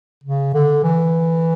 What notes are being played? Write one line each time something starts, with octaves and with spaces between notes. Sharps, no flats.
C#3
D3
E3